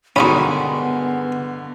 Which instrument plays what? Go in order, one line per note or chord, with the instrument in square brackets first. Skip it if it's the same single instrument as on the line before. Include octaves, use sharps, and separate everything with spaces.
[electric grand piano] G2 D3 [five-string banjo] D#3 G#3 B5 [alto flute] B3 [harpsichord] C#4 F#4